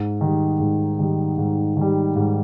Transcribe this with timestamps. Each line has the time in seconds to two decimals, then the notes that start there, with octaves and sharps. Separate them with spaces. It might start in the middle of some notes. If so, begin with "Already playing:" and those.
Already playing: G#2
0.21 D#3 G3
0.59 G#2
0.99 D#3 G3
1.38 G#2
1.77 D#3 G3
2.16 G#2